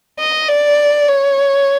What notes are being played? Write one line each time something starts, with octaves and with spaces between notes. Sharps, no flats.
D#5
D5
C#5